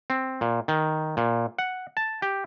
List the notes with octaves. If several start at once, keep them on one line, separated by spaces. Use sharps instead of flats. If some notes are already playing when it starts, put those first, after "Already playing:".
C4
A#2
D#3
A#2
F#5
A5
G4